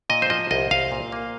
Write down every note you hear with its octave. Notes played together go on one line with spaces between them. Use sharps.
A#2 D#5
C5
F3 D#5
C2 D#5
C2 F5
A#2
A#3